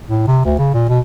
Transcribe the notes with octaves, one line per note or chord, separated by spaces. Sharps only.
A2
C3
D2
C#3
A#2
B2